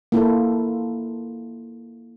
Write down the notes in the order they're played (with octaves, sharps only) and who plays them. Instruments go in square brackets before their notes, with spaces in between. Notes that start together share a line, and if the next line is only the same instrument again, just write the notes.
[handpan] A#3 E4 F4 A4